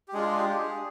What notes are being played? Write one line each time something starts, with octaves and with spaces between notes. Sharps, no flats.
G4
G#3 D4 F4 G#4
G4
G#4